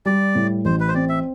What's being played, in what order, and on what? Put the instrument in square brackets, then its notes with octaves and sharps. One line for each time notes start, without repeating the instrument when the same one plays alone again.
[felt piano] G3 [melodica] D5
[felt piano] A2
[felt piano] A1 [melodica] C5
[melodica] B4
C5
[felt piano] C4 [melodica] D5
[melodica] E5